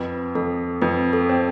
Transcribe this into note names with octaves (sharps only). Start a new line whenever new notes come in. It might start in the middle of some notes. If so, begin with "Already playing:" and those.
Already playing: F2 B4
F2 A4
F2 B4
A4
C4